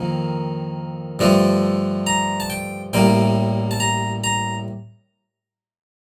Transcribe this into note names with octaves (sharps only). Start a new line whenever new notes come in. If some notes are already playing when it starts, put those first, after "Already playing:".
Already playing: F2 D#3 A#3
G2 D3 F3 A3 D4
A#5
A5
G5
A1 A2 G3 A#3 G5
A5
A#5
A#5